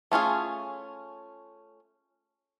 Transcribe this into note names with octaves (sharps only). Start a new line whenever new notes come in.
A3 C#4 F4 G#4